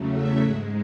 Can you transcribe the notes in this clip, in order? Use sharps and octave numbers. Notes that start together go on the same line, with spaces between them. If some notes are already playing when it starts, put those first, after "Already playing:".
Already playing: E2 C#3 F#3 A3
E5
G#2 G#3 F#5